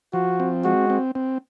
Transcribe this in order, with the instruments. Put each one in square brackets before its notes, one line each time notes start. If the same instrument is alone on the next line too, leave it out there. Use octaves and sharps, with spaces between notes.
[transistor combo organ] F3 [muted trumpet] F#4
[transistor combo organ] C4
[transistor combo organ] G#3 [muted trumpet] F#4
[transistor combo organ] C4
C4